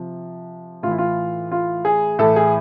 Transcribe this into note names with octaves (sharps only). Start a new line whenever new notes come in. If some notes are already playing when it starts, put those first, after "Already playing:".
Already playing: C3 F3
A2 E3 E4 F4
F4
F4
G#4
A2 E3 A4
G#4